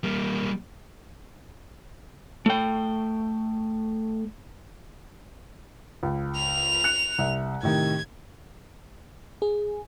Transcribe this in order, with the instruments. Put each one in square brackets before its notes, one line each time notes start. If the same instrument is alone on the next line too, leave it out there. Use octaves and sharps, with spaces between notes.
[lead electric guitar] G3 A#3
A3 G5
[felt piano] C#2
[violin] F7
[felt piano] F#6 C#7
C2 E5
[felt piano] A2 C3 D#3 [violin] G#6
[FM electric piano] G#4